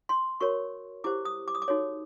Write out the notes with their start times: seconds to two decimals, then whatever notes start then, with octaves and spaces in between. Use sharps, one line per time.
0.09 C6
0.40 F#4 A#4 C#5 C#6
1.04 E4 G4 C5 D6
1.25 D#6
1.48 D6
1.55 D#6
1.62 D6
1.68 D#4 F#4 A4 C#5